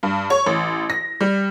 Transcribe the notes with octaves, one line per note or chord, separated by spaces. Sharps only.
G2
C#5
A1
A#6
G3